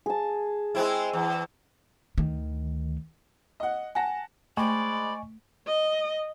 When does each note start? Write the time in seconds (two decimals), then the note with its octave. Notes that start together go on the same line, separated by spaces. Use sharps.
0.06 G#4 A5
0.75 G#3 C4 E4
1.13 E2
2.18 D2 D#3
3.60 D#5 F#5
3.95 F#5 G#5 A5 A#6
4.57 G#3 A3 C5 D5 D#5 G#5 B5 C#6
5.67 D#5